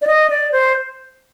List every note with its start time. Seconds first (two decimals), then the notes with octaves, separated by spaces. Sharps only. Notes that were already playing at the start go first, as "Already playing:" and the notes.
0.02 D5
0.07 D#5
0.30 D5
0.52 C5